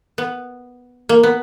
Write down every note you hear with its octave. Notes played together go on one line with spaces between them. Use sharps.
B3
A#3
B3